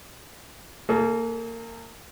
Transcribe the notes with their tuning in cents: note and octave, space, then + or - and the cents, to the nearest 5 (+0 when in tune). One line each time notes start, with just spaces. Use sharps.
A#3 -25 G#4 +45